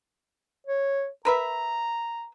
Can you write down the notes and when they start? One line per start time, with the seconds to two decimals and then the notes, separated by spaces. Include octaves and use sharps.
0.66 C#5
1.25 A#4 B4 E5 A#5